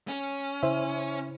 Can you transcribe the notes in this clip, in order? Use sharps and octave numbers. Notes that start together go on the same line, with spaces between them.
C#4
C#3 E4 C5 E5